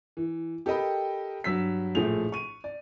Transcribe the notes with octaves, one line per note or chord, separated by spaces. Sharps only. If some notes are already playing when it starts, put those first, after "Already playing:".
E3
G4 A4 A#4 D#5 G5 B5
G2 F#3 E6 B6
A#1 A2 F3 A3 G#4 F7
C#6 D#7
D5